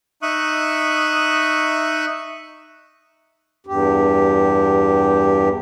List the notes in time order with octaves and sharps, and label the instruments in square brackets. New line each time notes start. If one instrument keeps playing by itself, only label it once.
[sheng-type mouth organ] D#4 E5 C#6 D#6 F#6
[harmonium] E2 G2 G4